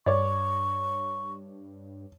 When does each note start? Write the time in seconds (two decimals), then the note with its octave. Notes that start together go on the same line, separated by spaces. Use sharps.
0.06 G2 C#5 D5 C#6